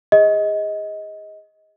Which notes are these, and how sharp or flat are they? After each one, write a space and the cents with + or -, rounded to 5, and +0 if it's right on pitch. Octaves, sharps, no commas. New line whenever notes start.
G#4 -30 D#5 +20